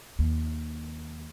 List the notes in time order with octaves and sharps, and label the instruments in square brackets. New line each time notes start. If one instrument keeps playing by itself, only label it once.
[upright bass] D#2